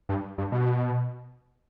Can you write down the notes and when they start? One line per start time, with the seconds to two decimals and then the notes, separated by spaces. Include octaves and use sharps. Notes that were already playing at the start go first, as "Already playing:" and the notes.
0.09 G2
0.38 G2
0.52 B2